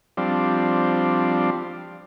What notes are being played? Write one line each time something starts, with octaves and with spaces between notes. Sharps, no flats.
F3 G3 C4 D4